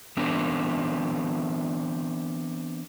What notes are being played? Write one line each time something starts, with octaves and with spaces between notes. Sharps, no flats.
E3 B3 C4 D4 A#4